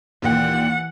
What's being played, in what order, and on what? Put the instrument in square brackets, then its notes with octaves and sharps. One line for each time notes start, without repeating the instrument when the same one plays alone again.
[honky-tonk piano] D#2 A#2 G5 [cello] E3 F#5